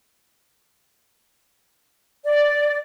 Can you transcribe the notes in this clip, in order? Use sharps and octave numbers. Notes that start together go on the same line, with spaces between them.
D5